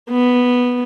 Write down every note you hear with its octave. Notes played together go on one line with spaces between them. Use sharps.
B3